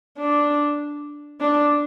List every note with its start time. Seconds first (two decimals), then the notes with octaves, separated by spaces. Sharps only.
0.18 D4
1.40 D4